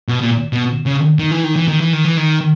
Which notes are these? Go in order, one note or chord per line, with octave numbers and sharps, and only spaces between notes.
B2
A#2
B2
C#3
D#3
E3
D#3
E3
D#3
E3
D#3
E3
D#3